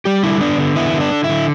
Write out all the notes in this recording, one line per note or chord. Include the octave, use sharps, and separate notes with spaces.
G3 G4
D3 E4
B3 D4
D3
B3 E4
D3
D4
D3
E4
D3